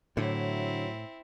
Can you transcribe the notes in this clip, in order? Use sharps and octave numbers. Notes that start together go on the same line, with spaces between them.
A2 D3 F#3 C4 E4